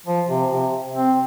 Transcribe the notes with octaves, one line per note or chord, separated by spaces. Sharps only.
F3
C3
C3
C4